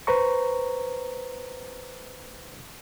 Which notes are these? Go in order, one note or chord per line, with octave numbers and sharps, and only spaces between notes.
B4 C5 A#5 C#6